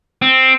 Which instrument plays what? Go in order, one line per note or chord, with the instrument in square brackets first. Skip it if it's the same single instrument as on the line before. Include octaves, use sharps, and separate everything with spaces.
[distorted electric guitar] C4